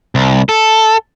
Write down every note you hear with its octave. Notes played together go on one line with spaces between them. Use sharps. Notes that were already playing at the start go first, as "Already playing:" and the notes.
C2
A4